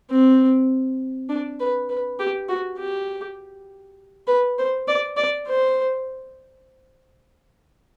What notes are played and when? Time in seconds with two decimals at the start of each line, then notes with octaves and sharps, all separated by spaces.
0.11 C4
1.29 D4
1.60 B4
1.89 B4
2.20 G4
2.49 F#4
2.79 G4
4.27 B4
4.58 C5
4.88 D5
5.17 D5
5.47 C5